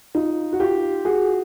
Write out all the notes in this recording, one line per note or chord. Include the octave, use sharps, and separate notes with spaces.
D#4 F4
F#4
F4 G4
F#4 G#4